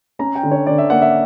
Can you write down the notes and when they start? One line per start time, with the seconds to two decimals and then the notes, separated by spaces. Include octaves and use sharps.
0.19 C#4 A#5
0.35 G5
0.43 D3
0.52 C#5
0.67 D3 D5
0.78 E5
0.90 A#3 F#5
1.02 E5